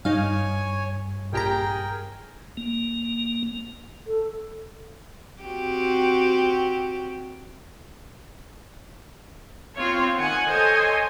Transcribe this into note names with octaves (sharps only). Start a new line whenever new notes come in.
G2 D#4 C#5 F5 G#5
A#1 G4 G#4 A#4 G5 A#5
A#3
A4
C4 F#4 G4
C4 F4 C#5
D#3 F#5 G#5
A4 C5 C#5 D#5 G#5